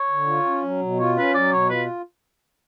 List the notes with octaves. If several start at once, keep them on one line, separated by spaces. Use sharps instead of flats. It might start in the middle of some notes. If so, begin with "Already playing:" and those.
Already playing: C#5
D3
F4
C#4
F#3
B2
F4 C#5
C#4 B4
F#3 D5
B2 C#5
F4 B4